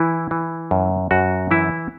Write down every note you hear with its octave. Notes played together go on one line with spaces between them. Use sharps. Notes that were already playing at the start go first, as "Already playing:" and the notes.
Already playing: E3 E4
E3
F#2
F#2 F#4
E3 E4